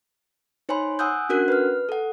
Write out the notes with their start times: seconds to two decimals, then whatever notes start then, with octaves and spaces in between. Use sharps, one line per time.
0.69 D#4 C5 C#5 G#5 B5 C6
0.99 F#5 G#5 D#6 E6 F#6 G6
1.29 C#4 D4 F#4 A#4 F#5 F#6
1.48 B4 F6
1.89 A4 F#5